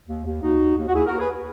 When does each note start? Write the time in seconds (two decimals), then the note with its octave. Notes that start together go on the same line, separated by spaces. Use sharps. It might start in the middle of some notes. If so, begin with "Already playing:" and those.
0.08 D#2
0.25 D#2
0.42 D#2 D#4 F#4
0.60 D#2
0.76 D#2
0.88 F#4
0.94 D#2 E4 G#4
1.06 D#2 F#4 A#4
1.19 G#4 B4